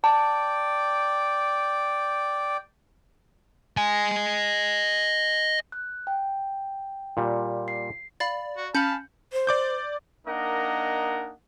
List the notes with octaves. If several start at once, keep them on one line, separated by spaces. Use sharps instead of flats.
D5 G5 A5
D#5 G#5
F#6
G5
A#2 G3
C7
D5 F5 B5 A6
F#4
C#4 F5 A5 B5 G6 C#7 F#7
C5
D5 D6 G6
A#3 D4 D#4 A#4 D#5 F#5